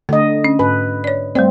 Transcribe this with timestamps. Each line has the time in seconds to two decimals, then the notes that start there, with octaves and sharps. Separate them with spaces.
0.09 D3 A3 D#5
0.44 C#4
0.59 G#2 B4
1.04 C#5 D5
1.35 G3 A3 C4 D5